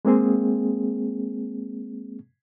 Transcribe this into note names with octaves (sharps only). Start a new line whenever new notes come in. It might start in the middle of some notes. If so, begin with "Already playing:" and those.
G#3 A#3 C4 G#4